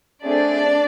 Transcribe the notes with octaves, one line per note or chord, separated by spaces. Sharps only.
A3 C4 D4 G#4 D5